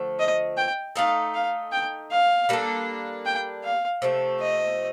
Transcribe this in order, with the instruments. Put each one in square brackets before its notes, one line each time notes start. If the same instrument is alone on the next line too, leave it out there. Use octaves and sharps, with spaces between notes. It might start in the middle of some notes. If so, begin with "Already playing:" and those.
Already playing: [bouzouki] D3 F3 A3
[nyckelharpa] D#5
G5
[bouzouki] A3 D#4 A4 [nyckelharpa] F5
[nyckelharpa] F5
G5
F5
[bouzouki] G3 A#3 D4 A4
[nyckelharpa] G5
F5
[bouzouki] C3 F3 A3
[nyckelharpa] D#5